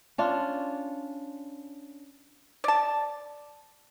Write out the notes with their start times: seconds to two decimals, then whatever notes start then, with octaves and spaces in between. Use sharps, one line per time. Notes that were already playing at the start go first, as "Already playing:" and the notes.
0.18 C#4 D4 F4
2.64 D5 A5